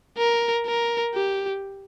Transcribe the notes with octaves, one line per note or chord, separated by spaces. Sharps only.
A#4
A#4
G4